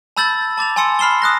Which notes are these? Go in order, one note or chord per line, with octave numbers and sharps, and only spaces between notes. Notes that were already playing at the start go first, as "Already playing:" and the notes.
A5 B5 E6 G6 A6 F#7
A5 D6 A6 F7
G#5 A5 C6 E6 C#7
B5 F6 C7 E7 G7
D#6 F#6 A#6